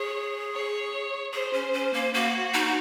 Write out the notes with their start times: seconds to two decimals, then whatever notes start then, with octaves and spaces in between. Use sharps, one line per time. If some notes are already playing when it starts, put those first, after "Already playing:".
Already playing: G#4 C#5
0.53 C#5
1.33 G#4 C5
1.53 C#4
1.73 C#4
1.94 A#3
2.14 A#3 F#4
2.54 D#4